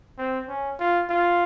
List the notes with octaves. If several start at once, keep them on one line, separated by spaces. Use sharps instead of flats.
C4
C#4
F4
F4